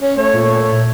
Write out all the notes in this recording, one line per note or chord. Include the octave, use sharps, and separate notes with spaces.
C#4
A3 C#5
A#2